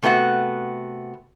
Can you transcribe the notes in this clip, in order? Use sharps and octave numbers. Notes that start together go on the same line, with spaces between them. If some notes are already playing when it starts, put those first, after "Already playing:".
C3 A3 B3 F#4 F#5